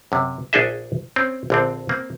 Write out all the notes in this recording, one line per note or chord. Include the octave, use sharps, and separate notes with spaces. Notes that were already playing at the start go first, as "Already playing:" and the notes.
F#2 C3
A#1 D4 D#4 G#4 D#5 E5
C4 C#4
A#1 D3 C4
A#3 C4